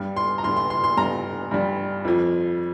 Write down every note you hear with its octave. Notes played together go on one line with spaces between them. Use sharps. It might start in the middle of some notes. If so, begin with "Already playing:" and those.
Already playing: G2 G3
C6
A#5
G2 G3 C6
C6
C6
C6
G2 G3 A#5
G2 G3
F2 F3